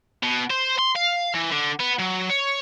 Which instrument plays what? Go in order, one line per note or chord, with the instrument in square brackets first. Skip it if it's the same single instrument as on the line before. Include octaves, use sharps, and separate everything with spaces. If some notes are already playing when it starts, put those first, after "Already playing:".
[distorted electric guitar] B2
C5
C6
F5
E3
D3
B3
F#3
C#5